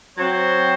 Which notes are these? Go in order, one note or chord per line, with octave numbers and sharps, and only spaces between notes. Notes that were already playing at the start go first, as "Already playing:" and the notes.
F#3 C4 F#4 C5